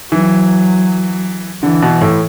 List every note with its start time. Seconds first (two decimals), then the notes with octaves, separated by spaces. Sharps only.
0.11 E3 F#3
1.63 D3 E3
1.82 B2
2.01 A2